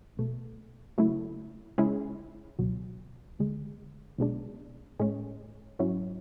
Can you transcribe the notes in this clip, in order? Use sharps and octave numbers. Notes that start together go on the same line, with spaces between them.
B1 B2 A3
C#3 F#3 A3 E4
C#3 G#3 C#4 E4 G#4
C#2 B2 F#3
D2 D3 G#3
B1 B2 G#3 D4
A2 G#3 C#4
G#2 F#3 C#4 E4